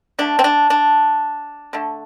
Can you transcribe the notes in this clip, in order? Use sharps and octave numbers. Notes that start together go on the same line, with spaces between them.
D3 A3 D4
C4
D4
D4
D3 A3